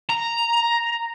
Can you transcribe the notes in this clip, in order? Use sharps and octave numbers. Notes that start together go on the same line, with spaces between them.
A#5